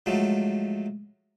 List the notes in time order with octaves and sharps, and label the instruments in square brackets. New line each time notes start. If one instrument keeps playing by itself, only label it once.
[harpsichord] G#2 F3 F#3 A3